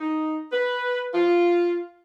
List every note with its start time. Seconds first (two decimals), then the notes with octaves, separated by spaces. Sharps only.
0.01 D#4
0.52 B4
1.14 F4